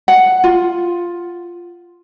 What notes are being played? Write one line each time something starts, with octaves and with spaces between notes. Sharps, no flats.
F#5
F4